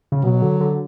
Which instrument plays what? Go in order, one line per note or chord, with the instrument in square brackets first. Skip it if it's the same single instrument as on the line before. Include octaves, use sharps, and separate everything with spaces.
[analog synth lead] C#3
[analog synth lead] B2 [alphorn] F#3
[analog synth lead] D3
D3